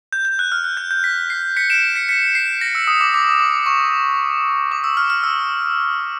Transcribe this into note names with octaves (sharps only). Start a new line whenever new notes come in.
G6
G6
F#6
F6
F#6
G6
G6
B6
C7
B6 C#7
D7 E7
B6 C#7
B6 C#7
C7
A#6
E6
D#6
D6
D6
D6
C#6
D6
E6
F6
F6
E6